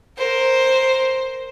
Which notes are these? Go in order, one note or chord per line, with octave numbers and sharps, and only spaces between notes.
A#4 C5